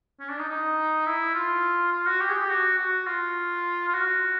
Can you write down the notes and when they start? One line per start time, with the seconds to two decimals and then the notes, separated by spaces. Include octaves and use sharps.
0.20 C#4
0.30 D4
0.39 D#4
0.49 D#4
1.06 E4
1.35 F4
1.93 F4
2.07 F#4
2.21 G4
2.29 G#4
2.37 G4
2.50 F#4
2.79 F#4
3.07 F4
3.88 F4
3.94 F#4